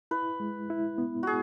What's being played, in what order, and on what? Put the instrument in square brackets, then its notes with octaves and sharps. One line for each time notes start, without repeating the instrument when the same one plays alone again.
[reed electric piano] E4 [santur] B4
[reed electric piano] G#3
E4
B3
[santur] F#4 G#4